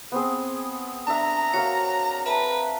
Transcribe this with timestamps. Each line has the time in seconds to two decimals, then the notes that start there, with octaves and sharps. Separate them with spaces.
0.12 B3 C4 G#4
1.07 D4 E5 A#5
1.54 F#4 A#4 C#5 F5
2.26 B4 E5 A5 A#5